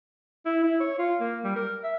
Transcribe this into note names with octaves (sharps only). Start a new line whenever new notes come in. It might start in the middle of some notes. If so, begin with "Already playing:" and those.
E4
E4
C#5
F4
A#3
G3
A#4
E5